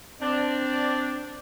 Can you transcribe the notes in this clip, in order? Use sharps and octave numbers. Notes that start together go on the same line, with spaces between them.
C4 D4